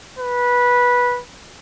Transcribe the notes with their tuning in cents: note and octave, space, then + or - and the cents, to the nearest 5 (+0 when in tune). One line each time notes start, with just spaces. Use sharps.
B4 -15